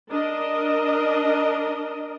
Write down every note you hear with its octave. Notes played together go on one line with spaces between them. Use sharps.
D4 A#4 D#5